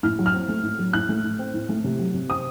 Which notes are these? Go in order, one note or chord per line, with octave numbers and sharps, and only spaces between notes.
A2 F6
F#3
F6
C4
A3
A2
F#3
A2 F#6
A3
A2
C4
A2
A3
C3
F#3
C3
C4 D#6